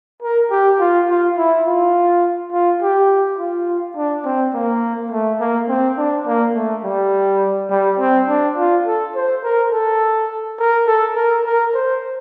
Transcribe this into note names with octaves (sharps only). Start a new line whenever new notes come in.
A#4
G4
F4
F4
E4
F4
F4
G4
F4
D4
C4
A#3
A3
A#3
C4
D4
A#3
A3
G3
G3
C4
D4
F4
A4
C5
A#4
A4
A#4
A4
A#4
A#4
C5